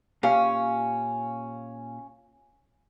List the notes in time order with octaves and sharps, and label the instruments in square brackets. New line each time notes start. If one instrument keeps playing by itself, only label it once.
[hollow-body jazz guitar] A#2 G4 F5 [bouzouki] C#4